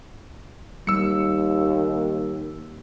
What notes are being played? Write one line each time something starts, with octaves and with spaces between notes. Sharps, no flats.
D#2 G3 E6 C#7